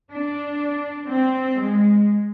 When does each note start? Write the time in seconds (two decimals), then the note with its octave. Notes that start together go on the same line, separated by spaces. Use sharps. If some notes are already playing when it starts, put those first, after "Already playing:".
0.12 D4
1.06 C4
1.57 G#3